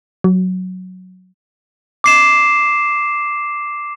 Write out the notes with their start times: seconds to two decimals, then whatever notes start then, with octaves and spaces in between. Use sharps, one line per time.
0.24 F#3
2.04 D6 C7 E7